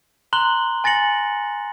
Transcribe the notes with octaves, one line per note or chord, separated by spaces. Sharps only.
A#5 C6 F#6 F#7 G7
G#5 A6 A#6 C#7 F#7